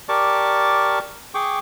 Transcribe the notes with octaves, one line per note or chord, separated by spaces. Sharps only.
G4 A#4 D5 A5 C#6 D6
G#4 G5 C#6 D6